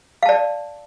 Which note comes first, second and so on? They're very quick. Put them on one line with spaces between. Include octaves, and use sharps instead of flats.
F5 A5 D5